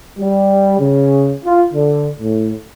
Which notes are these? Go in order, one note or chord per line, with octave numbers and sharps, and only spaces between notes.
G3
C#3
F4
D3
A2